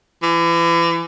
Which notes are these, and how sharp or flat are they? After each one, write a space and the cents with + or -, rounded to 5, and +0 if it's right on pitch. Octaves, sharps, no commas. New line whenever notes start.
E3 +35